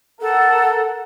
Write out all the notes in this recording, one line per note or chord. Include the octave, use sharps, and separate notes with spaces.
A4 A#4 F#5